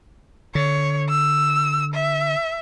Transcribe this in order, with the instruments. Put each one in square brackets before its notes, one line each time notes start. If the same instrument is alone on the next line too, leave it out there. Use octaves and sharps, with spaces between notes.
[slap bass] D3 [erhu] C#5
[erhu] E6
E5